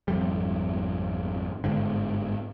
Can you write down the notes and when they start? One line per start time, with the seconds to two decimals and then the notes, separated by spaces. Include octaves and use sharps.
0.08 G#1 F2 G3
1.64 G1 G#2 D3